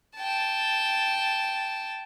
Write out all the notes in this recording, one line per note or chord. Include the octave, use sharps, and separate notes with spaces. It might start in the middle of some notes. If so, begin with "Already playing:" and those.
G5 A5